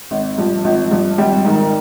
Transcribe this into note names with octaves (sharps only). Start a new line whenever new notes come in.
G#1
G2 F3
G#1 F3
G2 F3
G#1 G3
G#2 D#3